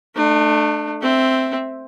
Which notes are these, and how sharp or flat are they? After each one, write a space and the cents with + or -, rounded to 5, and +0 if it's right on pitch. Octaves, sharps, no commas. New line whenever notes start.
A3 +0 D4 +35
C4 +0 E5 +0